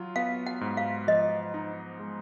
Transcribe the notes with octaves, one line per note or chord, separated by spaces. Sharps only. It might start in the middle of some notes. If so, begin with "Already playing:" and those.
Already playing: F#3 F4
B3 F5
F#5
G#2
F5
F3 D#5
D#4
G#3